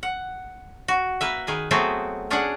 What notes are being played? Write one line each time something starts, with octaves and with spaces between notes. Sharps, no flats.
F#5
F#4
A#3 B4 E5
D#3 G#4 B4
F#3 A3 B3 C4 F#4 G#4
C#4 D4 G#4 C#5 D5 F#5